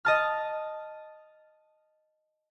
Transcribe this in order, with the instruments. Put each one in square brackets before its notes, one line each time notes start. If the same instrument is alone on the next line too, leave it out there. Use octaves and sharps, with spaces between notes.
[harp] D#5 A5 F6